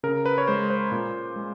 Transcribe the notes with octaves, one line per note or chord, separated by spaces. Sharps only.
C#3 A#4
B4
C#5
G#3 C5
C5
A#2
G#3